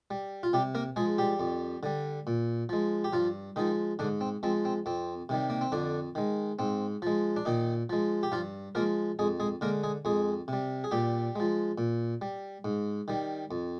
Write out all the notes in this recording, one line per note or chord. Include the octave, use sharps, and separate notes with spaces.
G3
F4
C3 G3 G4
A#3 A#4
F3 G#3 G#4
G3 G4
F2
D3 G3
A#2
F3 G#3
G4
G2 F3 F4
D#3 F3 G#3 D#4
G#2 D3 D4
C4
F3 G#3 C4
C4
F2 C4
C3 D#3 G3
A#3
C4
F2 D3 D4
D#3 G#3
G#2 C4
F3 G#3
D4
A#2 D#3 D#4
F3 G#3
G4
G2 F3 F4
F3 G#3 A#3 A#4
F2 G#3 G#4
G#3 G#4
D3 G#3 A#3 A#4
G#3 G#4
F2 G#3 G#4
C3 G3
G#4
A#2 G3 G4
F3 G#3
A#2
G3
G#2
D#3 G3
F2